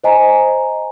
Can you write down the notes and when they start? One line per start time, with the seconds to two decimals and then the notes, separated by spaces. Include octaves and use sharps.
0.04 C5 D#5 G#5 A#5